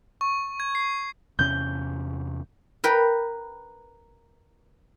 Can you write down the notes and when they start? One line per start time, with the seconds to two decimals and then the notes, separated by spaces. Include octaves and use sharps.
0.21 C#6
0.60 G#6
0.75 C7
1.39 E2 C3 C#4 G6
2.84 A#4 B4 G5